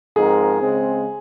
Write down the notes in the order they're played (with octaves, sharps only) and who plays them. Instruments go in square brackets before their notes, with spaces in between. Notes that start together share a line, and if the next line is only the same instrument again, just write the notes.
[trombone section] G#2 F3 C4 D#4 A#4 [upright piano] G#4
[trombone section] C#3 G#3 C4